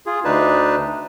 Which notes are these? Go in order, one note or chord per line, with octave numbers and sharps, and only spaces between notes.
F4 G#4
D2 D4 D#4 B4 A5